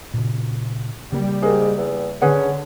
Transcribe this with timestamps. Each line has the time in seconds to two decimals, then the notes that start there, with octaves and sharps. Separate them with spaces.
0.14 A#2 C#3
1.12 C#3 G3 A#3
1.42 G#2 G#4 A#4
1.78 E2
2.21 D3 C#4 G#4 B4 F#5